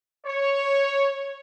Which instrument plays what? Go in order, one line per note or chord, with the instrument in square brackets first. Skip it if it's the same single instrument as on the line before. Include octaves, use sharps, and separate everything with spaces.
[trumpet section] C#5